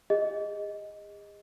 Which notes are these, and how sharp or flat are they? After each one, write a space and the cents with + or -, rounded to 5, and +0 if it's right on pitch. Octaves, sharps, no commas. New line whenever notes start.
G#4 -40 D#5 +0